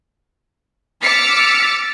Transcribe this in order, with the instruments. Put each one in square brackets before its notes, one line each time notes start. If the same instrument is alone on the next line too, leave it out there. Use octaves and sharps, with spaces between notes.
[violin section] D6 E6 F6 A6 B6 C#7